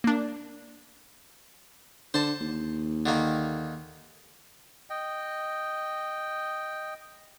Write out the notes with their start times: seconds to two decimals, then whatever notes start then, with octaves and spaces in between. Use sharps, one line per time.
0.04 A#3 D4
2.14 D3 C5 A5
2.40 D#2
3.06 D3 D#3 A#3
4.90 D#5 G5